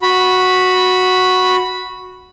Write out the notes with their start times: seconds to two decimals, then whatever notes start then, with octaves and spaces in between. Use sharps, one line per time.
0.02 F#4 B5